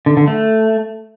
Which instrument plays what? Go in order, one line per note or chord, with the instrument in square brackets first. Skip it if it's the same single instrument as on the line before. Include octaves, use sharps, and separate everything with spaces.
[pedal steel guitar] D3
D3
A3